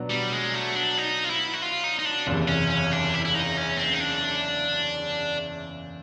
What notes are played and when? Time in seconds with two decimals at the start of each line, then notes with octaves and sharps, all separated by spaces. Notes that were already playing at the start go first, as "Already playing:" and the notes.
Already playing: B2 F#3 B3 D4 F#4
0.10 G3
0.32 G#3
0.54 A3
0.75 D4
0.97 D#4
1.24 F4
1.30 E4
1.54 F#4
1.62 F4
1.84 D#4
1.99 D#4
2.05 D4
2.27 F#1 E2 C3
2.48 C#4
2.70 C#4
2.92 D4
3.14 E4
3.25 E4
3.35 D#4
3.57 C#4
3.78 C4
3.93 D#4
4.00 D4